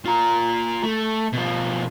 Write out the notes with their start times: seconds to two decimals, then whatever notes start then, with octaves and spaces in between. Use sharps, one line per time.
0.06 F4 A#5
0.83 A3
1.33 B2 F3